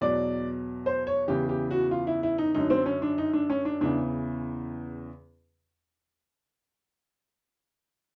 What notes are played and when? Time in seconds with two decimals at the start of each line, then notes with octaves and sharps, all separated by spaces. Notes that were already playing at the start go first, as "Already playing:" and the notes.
0.01 E2 B2 F#3 D5
0.86 C5
1.07 C#5
1.28 E2 C#3 E3 G4
1.49 G4
1.71 F#4
1.91 F4
2.07 E4
2.23 E4
2.38 D#4
2.54 F#2 D3 F#3 D#4
2.70 C4
2.86 C#4
3.02 D4
3.18 D#4
3.33 D4
3.50 C#4
3.65 D4
3.81 E2 C#3 E3 D4